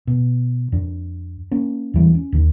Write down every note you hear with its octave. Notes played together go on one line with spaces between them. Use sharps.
B2
F2 D4
A#3 C#4
E2 E3 G3
C#4
D#2 D#3